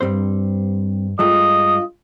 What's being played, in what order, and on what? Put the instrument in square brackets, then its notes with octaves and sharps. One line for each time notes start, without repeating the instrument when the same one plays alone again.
[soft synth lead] G2 [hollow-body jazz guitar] G3 C4 C5
[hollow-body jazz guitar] G2 G#3 A3 [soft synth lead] F4 [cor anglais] D#5